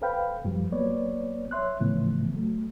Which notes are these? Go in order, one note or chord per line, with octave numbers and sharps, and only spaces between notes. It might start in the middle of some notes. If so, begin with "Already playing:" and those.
A4 B4 C5 F5 G5 B5
F#2 F3 G3
F#3 A#3 B3 B4 C#5 D5
C#5 E5 C6 F#6
A2 C#3 E3 F3 A3 B3
F#3 A3